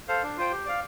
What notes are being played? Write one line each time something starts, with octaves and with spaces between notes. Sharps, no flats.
A4 C5 F5
D4
F4 C5 G5
G4
D5 F5